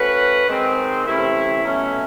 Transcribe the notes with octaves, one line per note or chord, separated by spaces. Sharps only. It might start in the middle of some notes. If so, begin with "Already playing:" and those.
Already playing: A3 C#4 F#4 B4
G#2 D#3 G#3 C4
C3 E3 A3 C#4 E4
B2 F#3 A3 C#4